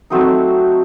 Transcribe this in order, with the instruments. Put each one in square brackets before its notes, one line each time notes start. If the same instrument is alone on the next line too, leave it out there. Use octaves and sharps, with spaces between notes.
[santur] F#3 A3 C4 D#4